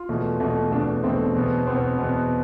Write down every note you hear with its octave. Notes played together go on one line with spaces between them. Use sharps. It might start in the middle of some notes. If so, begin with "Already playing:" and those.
Already playing: F4
E2 B2 A3
E2 B2 A3
E2 B2 A3 D4
E2 B2 A3 C4
E2 B2 B3
E2 B2 B3 C4
E2 B2 B3